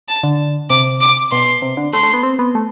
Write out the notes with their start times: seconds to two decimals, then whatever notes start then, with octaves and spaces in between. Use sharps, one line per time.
0.08 A5
0.23 D3
0.70 C3 D6
1.01 D6
1.32 B2 C6
1.62 C3
1.77 D3
1.93 A3 C6
2.03 A3
2.14 B3
2.23 C4
2.39 B3
2.55 A3